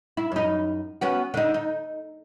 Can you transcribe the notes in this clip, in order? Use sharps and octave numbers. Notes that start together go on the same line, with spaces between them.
E4
F#2 D#4
B3 C#4 F#4
D3 D#4
D#4